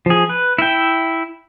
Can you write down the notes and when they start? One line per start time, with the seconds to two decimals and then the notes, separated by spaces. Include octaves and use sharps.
0.06 F3 G#4
0.29 B4
0.58 E4 E5 G5